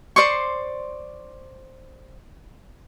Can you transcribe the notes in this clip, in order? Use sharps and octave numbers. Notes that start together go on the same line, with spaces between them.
C5 D5 C6 C#6